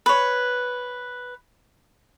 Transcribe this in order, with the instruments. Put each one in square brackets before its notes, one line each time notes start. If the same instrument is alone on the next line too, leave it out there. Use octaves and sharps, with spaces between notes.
[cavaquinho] B4 C#5